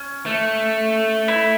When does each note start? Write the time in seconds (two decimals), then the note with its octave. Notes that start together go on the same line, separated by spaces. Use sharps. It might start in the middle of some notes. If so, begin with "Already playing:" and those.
Already playing: C#4
0.26 A3
1.28 E4